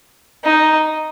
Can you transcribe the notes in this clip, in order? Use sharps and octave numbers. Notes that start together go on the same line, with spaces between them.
D#4